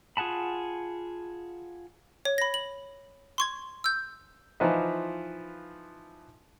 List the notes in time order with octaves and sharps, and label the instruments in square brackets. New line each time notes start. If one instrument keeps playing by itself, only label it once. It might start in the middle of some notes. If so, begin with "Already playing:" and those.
[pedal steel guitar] F4 G#4 F#5 A5 B5
[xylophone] C#5
B5 A#6
F#7
C6 C#6 G#6
E6 G6
[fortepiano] E3 F3 D#4 F4 B4 D#5